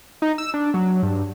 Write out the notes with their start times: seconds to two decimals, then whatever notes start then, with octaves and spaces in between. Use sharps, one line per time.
0.22 D#4
0.38 E6
0.54 D4
0.74 F#3
1.03 G2